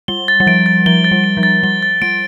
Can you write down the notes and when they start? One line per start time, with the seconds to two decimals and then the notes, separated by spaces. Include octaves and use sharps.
0.08 G3 G7
0.28 A6
0.40 G3
0.47 F3 D7
0.66 A6
0.86 F3 G7
1.04 A6
1.12 G3
1.24 D7
1.37 F3
1.43 A6
1.63 G3 G7
1.83 A6
2.02 G3 D7